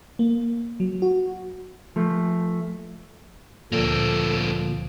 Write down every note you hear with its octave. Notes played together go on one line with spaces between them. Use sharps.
A#3
F#3
F#4
F3 A3
D2 A#2 F3 A#3 C4 A4